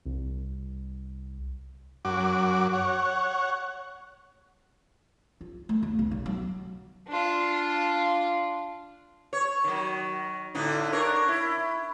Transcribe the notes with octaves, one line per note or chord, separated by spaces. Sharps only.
C2
F#2 F#4 D6
C#5 F#5
F4
A3
D#2
B1
B1
F#3
D4 F4
C#5
D#3 F#3
A2 D3 D#4
D4 A#4 C#5
E4